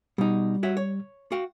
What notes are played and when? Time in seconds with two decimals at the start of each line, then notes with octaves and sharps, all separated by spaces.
0.18 B2 G3 D#4
0.63 F#4 C#5 E5
0.77 C#5
1.32 F#4 F5 G5